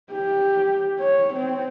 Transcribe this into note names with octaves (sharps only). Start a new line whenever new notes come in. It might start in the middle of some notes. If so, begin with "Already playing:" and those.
G4
C#5
C4